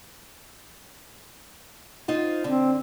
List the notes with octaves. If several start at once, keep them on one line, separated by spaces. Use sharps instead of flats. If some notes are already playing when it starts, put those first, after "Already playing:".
D#4 F4 C5
D3 C4